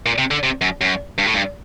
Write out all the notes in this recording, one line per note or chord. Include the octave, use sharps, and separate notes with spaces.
A#2
C3
D3
C3
F#2
F#2
G2
A2
G2